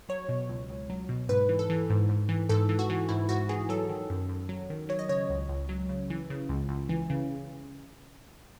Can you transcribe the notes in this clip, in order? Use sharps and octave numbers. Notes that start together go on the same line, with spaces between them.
F#3 C#5
B2
C#2
C#2
F#3
B2
G#2 B4
E3
A4
E3
G#2
G#2
E3
G#2 A4
E3
F#4
E3
G#2 E4
G#2 F#4
E3 G#4
F#3 A4
D#3
F#2
F#2
F#3
D#3
F#3 C#5
D#5
C#3 C#5
C#2
C#2
F#3
C#3
E3
C#3
C#2
C#2
E3
C#3